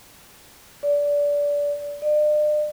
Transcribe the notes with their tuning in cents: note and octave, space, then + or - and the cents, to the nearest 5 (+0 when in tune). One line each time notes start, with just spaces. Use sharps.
D5 -20
D5 +40